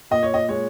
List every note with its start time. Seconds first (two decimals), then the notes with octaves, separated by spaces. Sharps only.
0.11 A#2 D#5
0.23 C#5
0.34 D#5
0.48 G#3 C#5